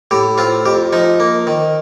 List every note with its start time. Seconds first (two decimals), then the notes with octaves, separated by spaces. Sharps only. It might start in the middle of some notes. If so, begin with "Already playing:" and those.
0.11 A2 G4
0.38 C4 F4
0.66 F2 G4
0.93 F3 D#4
1.20 A#3
1.47 D#3